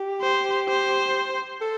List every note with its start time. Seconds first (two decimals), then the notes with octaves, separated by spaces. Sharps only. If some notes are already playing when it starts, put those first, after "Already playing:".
Already playing: G4
0.22 C5
0.68 C5
1.61 A4